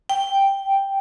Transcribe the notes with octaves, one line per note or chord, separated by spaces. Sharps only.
G5